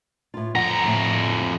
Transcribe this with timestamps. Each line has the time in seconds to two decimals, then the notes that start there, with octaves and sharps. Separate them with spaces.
0.34 A2 F4
0.55 F2 F3 F#5 A#5
0.85 A2